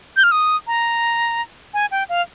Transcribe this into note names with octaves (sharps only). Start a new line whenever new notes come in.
G6
F6
D#6
A#5
G#5
G5
F5